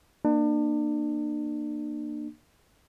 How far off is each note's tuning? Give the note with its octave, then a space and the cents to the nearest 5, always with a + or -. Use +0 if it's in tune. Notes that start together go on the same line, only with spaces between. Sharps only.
A#3 +0 D4 +35